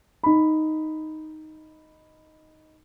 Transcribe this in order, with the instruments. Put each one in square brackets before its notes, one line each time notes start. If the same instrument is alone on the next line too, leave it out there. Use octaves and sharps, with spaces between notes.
[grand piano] D#4 B5